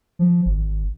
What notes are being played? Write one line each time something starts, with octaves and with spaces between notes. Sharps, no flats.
F3
G#1